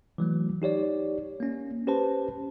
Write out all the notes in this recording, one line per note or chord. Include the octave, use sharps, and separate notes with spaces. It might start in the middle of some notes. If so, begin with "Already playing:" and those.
E3 F#3 A3
D#4 G4 C#5 D5
A#3 C#4
C#4 G4 B4 C5 A5